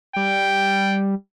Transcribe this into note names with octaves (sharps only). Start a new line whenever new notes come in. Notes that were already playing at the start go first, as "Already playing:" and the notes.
G3 G5